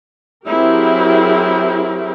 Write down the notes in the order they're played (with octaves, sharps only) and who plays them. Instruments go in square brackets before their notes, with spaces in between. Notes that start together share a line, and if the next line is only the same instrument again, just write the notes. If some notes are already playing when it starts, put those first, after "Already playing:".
[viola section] F#3 C4 E4 G4 G#4 A#4